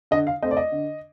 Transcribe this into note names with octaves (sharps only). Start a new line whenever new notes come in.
D3 D#5
F5
A3 C4 D#5
D5
D#5
D3